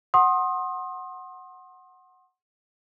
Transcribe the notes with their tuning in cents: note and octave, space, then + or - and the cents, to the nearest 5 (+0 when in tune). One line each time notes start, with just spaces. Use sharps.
F#5 +0 C6 +30 D#6 +0